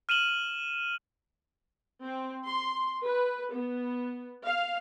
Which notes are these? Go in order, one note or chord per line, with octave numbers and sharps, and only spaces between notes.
F6 D#7 E7 F#7 G7
C4
C6
B4
B3
F5